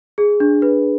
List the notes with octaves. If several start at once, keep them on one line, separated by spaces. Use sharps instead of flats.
G#4
D4
B4